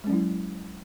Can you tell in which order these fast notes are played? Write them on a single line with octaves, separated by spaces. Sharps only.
G#3 C#4 F#3 E4